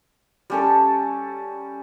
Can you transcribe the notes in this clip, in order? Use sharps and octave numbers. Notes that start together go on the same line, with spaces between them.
G3 C#4 A4